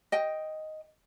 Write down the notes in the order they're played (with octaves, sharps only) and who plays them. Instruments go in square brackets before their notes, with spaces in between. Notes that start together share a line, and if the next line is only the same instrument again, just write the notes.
[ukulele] D#5 G5